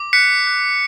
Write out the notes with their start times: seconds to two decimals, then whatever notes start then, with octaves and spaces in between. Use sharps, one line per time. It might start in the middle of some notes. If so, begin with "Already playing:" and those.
Already playing: D6
0.13 F#6 B6 C#7
0.47 F#6